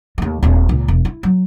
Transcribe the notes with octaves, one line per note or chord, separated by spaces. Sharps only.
D#2 A3
D#1 C4
C#2 A#2
E1
E4
F#3